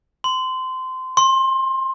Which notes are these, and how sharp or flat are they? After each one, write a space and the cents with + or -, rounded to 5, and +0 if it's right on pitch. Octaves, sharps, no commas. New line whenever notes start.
C6 -20
C6 +25